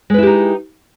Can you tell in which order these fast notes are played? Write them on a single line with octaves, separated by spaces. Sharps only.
G#3 B4 E4 G4 D#4